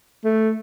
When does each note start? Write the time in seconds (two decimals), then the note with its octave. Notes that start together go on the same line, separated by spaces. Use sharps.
0.24 A3